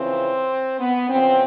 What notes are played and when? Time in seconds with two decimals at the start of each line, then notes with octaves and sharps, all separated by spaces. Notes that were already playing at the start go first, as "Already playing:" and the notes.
Already playing: F2 C#3 E3 C4
0.80 B3
1.09 E2 C#3 F3 C4